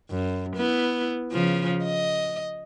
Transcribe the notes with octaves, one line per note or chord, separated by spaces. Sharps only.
F#2
B3 E4
C#3 F3
D#5